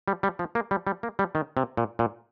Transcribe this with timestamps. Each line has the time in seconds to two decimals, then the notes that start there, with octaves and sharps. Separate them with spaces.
0.08 G3
0.23 G3
0.39 F3
0.55 A#3
0.71 G3
0.87 G3
1.03 A#3
1.19 G3
1.35 D#3
1.57 C3
1.77 A#2
1.99 A#2